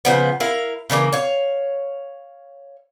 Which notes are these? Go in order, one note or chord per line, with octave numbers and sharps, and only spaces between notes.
C#3 F3 B3
E4 A#4 F5
C#3 E3 G#3 A#3
C#5 F5